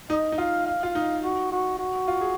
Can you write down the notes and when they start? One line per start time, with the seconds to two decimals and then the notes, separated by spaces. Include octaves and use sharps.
0.10 D#4 D#5
0.32 D#4
0.38 F4 F5
0.66 F5
0.83 F4
0.95 D#4
1.23 F#4
1.52 F#4
1.79 F#4
2.08 F4
2.21 G#4